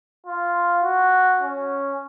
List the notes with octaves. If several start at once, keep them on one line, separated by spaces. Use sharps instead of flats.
F4
F#4
C#4